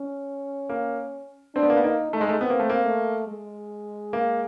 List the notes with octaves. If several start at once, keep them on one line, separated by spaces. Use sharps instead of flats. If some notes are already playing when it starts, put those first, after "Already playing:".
Already playing: C#4
A#3
C4 D4
B3
A#3
B3
A#3 D#4
A3 D#4
G#3
A3
B3 C4
A#3
A3
A#3
A3
G#3
A#3